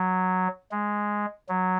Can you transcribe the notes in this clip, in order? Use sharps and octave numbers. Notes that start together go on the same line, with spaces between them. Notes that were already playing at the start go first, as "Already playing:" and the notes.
Already playing: F#3
G#3
F#3